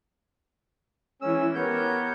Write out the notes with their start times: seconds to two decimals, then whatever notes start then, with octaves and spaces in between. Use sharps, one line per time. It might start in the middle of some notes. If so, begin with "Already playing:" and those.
1.22 E3 G#3 C#4 E6
1.55 B3 G4 A#4 C#5 G6